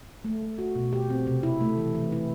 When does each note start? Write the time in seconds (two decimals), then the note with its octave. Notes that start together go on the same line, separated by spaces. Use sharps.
0.24 A3
0.42 A3
0.58 F#4
0.75 B2
0.93 G4
1.10 C4
1.27 C3
1.43 E4
1.61 A3
1.77 E3
1.95 E3
2.12 E4